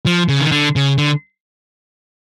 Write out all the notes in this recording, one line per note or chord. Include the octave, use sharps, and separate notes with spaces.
F3
C#3
D#3
D3
C#3
D3